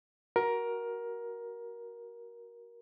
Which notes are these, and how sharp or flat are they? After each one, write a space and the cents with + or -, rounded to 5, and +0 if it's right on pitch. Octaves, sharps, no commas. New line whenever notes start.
F#4 +10 A#4 +15